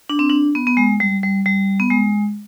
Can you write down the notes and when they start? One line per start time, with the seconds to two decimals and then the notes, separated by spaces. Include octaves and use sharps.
0.09 D4
0.19 C4
0.30 D4
0.55 B3
0.67 B3
0.77 G#3
1.00 G3
1.23 G3
1.46 G3
1.80 B3
1.90 G#3